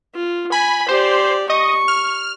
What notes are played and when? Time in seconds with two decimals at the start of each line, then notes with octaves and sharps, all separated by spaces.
0.15 F4
0.52 G#5 B5
0.88 G4 C5 D5
1.50 D#5 C#6
1.88 F6